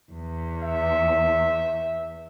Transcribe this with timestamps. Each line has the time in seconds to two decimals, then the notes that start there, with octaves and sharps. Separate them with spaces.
0.12 E2
0.63 E5